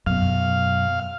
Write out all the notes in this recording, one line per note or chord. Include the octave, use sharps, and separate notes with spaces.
F#2 B2 F5